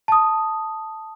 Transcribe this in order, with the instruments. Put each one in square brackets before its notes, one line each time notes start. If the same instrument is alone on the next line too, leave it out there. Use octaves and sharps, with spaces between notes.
[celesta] A5 D#6